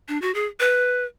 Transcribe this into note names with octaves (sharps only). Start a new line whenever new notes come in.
D4
F#4
G#4
B4